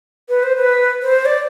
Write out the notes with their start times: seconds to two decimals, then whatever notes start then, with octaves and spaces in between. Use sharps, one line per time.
0.29 B4
0.43 C5
0.56 B4
1.02 C5
1.25 D5